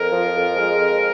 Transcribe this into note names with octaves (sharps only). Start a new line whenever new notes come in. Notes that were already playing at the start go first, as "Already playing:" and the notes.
Already playing: F2 A#4
F3
F2
G#3
F2